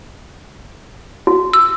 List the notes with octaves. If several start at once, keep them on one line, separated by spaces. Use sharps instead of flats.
F#4
E6